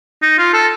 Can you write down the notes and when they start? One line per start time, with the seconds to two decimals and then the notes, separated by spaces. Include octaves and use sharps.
0.22 D#4
0.38 F4
0.54 A4